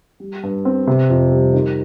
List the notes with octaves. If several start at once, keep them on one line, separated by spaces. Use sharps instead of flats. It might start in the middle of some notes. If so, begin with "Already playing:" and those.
G3
G2
C4
C3
F2
G3
D#3